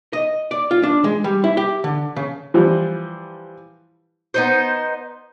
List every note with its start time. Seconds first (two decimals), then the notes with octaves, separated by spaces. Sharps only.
0.13 D#5
0.51 D5
0.71 F4
0.83 D4
1.04 G#3
1.24 G3
1.44 E4
1.57 G4
1.84 D3
2.16 C#3
2.54 E3 F3 G3
4.34 B3 D#4 C5